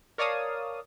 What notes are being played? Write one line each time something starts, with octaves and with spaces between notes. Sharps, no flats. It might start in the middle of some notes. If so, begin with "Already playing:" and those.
A#4 C#5 D5 F5 A5 D#6